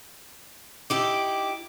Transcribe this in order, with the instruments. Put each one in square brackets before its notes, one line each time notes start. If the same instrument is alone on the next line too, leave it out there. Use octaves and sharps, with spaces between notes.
[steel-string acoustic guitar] D#4 E4 G4 [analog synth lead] D6